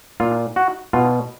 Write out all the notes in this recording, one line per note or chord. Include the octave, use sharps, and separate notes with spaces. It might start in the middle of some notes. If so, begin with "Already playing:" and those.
A#2 F4
F#4
B2 F4